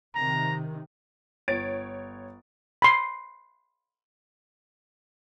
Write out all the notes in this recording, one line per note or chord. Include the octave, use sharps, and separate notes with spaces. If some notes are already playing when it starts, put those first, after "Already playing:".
C3 D#3 A#5
G1 C#5 A6 D7
B5 C6